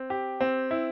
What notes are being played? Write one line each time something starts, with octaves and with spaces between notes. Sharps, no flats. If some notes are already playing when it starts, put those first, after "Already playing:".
Already playing: C4
G4
C4
E4